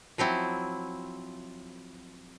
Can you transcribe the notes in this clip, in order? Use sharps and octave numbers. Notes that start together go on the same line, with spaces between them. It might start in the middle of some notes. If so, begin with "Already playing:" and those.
F3 F#3 C4 E4